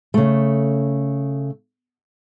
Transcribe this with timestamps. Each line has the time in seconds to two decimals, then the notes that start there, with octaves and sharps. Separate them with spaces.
0.14 C#3 A3